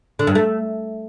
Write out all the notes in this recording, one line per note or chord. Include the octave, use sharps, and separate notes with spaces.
D3
G2
A3